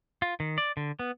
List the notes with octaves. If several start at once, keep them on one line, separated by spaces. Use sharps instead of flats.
F4
D#3
D5
D3
B3